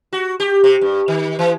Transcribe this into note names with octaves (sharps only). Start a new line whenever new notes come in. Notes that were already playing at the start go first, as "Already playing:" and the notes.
F#4
G4
C3
G2
D#3
E3